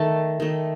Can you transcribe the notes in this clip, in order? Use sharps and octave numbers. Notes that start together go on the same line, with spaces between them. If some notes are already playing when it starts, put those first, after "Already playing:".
Already playing: D#3 A3 A5
D#3 A3